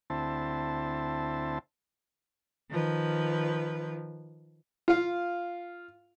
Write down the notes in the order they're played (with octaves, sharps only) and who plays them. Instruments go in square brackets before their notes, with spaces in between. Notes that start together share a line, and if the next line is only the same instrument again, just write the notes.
[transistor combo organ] D2 C4 E4 A5
[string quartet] D#3 F3 B4
[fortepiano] F4 F5